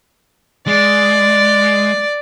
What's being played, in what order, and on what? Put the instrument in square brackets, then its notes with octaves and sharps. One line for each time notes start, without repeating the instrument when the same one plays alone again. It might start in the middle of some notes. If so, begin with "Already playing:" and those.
[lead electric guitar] G#3 [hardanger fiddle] D5